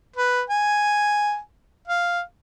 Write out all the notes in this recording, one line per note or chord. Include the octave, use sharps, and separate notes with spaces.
B4
G#5
F5